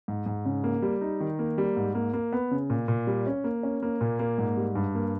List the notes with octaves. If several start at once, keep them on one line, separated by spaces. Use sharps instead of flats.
G#2
G#2
C#3
A#3
G3
D#4
D#3
A#3
G3
G#2
A#3
A#3
B3
C#3
A#2
A#2
G3
C#4
A#3
C#4
A#3
A#2
A#3
G#2
G3
G2
A#3